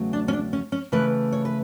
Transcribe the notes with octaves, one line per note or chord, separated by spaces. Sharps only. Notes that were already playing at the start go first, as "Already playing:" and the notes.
Already playing: E2 C#3 F#3 A3
D4
C#4
D4
C#4
C#4
C#3 E3 A3 B4
C#5
B4